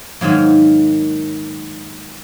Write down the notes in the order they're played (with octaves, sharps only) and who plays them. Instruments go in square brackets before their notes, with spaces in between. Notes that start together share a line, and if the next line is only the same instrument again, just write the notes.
[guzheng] G#2 D#3 F#3 A#3